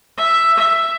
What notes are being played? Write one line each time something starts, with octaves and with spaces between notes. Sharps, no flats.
E5
E5